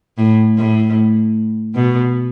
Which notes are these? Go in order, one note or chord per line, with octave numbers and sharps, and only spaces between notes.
A2
A2
B2